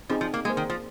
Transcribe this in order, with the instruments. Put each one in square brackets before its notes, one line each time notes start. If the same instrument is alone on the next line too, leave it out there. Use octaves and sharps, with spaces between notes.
[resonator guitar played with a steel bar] F3 [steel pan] C4 D#4 G#4
[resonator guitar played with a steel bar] F3
A#3
[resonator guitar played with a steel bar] G#3 [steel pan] A#3 G#4 C5
[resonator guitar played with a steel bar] D#3
F3